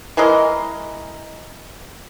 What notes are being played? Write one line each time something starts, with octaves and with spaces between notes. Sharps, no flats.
E3 G#3 A#4 D#5